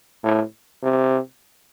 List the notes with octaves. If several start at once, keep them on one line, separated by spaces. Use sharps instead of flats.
A2
C3